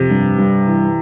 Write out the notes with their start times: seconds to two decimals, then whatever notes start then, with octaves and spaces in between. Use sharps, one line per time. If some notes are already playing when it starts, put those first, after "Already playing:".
Already playing: F2 C3
0.10 G2
0.38 G2
0.66 E3